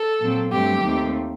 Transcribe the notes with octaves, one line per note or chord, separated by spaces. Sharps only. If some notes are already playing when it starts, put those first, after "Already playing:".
Already playing: A4
A#2 F#3 C4
G2 F#3 A3 C4 G4
D#2 D#3 A3 C4